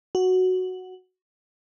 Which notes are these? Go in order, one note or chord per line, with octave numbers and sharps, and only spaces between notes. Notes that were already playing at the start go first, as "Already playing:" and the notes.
F#4